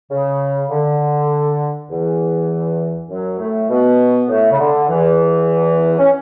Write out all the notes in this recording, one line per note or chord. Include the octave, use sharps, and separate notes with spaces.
C#3
D3
E2 E3
F#2 F#3
A2 A3
B2 B3
A2 A3
C#3
D3
E2 E3
C#4